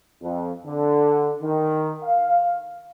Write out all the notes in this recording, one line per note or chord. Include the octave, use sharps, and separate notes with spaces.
F2
D3
D#3
F5